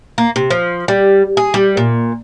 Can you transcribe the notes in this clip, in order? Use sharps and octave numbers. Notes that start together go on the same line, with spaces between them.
A#3
C3
F3
G3
G#4
G3
A#2